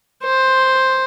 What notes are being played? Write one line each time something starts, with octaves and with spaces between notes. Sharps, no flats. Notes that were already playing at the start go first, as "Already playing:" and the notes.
C5